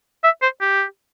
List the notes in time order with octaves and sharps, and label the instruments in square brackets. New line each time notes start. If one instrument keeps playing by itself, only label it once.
[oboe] E5
C5
G4